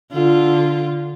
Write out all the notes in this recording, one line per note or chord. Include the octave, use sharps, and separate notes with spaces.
D3 F4